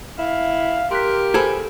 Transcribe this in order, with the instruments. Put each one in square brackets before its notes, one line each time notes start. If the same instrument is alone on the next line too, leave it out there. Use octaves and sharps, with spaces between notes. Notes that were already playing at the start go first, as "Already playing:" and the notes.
[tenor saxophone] E4 [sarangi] F5
[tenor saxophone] G4 [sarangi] A#4 [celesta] C6 F#6 B6
[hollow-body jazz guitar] G#4 A4 [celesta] C5 B5